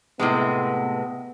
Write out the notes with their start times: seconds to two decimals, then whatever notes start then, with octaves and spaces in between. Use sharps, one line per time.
0.19 A2 C3 G#3 B3